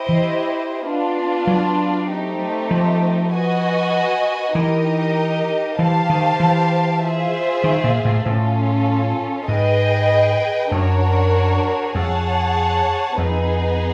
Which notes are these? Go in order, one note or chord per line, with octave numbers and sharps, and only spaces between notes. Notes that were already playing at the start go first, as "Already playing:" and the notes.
Already playing: E4 G4 C5 D#5
E3
B3 D4 F4
F#3
A3 C4 D#4 G4
F3
F#4 B4 D#5 G#5
E3 D#4 G4 A#4 D#5
E3 G4 C5 F5 A5
D#3
E3
F4 G#4 C5 E5
D#3
A#2
A2
A2 C#4 F4 A4
G#2 G#4 B4 D#5 G5
F#2 D4 F#4 A#4 C#5
F2 G#4 C#5 F#5 A5
F2 B3 D#4 G#4 B4